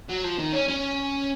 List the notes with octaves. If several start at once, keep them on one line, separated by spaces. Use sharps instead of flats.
F#3
F3
D#3
C#4
C#4